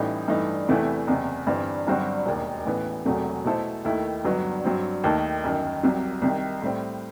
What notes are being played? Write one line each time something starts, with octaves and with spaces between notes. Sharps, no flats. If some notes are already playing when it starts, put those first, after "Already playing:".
Already playing: A1 A2 E3 G3 D#4
G2 E3 A3 D#4
E2 C3 E3 A3 E4
F#1 E2 C3
G1 G2 E3 G3 C4
G1 G2 F#3 C4 F#4
E1 D#2 D#3
A1 A2 E3 B3
E1 E2 C3 F#3 A3
B2 A3 E4 A4 C5
D#2 D#3 A3 E4
G1 G2 F#3 B3
G2 F#3 C4
D#2 D#3 A3 D#4 A4
G1 F#2 D#3
C2 C3 F#3
C2 C3 D#3
A2 G3 C4